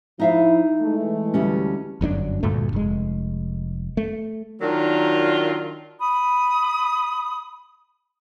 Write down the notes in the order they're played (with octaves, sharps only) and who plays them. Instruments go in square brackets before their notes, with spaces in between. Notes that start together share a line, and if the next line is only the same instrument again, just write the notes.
[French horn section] F3 E4 [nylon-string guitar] D#4 E5 F5
[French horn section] E3 G#3 A3
[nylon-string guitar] D2 G3 C#4
[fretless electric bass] G1 F#2 C#4 D4
D2 G2 A#2 A3
F1 G#3
A3
[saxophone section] D#3 F#3 D4 F4 A#4
[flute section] B5 D#6